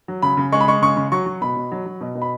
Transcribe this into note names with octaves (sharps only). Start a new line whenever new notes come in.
F#3
C#3 B5
C#3
G#3 C#6
B5
G#3 C#6
C#3 C#6
C#3
F#3 C#6
F#3
B2 B5
B2
F#3
F#3
B2
B2
B5